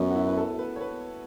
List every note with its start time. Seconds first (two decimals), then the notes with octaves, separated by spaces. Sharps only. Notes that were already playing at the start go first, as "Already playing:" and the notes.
Already playing: F#2 B3
0.11 F#4
0.15 E4
0.27 B4
0.37 A4
0.59 B4
0.76 C#5
0.81 B4